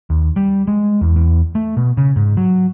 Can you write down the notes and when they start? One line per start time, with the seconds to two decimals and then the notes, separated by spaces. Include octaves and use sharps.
0.10 D#2
0.36 G3
0.67 G#3
1.01 E2
1.16 E2
1.55 A3
1.77 B2
1.97 C#3
2.16 G#2
2.37 F#3